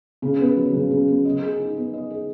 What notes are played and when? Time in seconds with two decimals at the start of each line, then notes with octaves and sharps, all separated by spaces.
0.22 C#3
0.40 B3
0.57 F#3
0.73 C#3
0.91 C#3
1.08 B3
1.25 D#5
1.42 G#4
1.59 D#4
1.76 B3
1.93 D#5
2.10 G#4